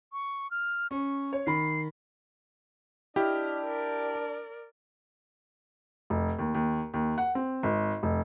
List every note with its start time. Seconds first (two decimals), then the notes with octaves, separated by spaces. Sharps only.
0.13 C#6
0.51 F6
0.91 C#4 C#6
1.33 C#5
1.47 D#3 B5 C7
3.16 D4 E4 G4 D#5 F6
3.66 A#4 D5
6.10 F1
6.39 D#2
6.55 D#2
6.94 D#2
7.18 F#5
7.35 C4
7.63 G#1
8.03 F1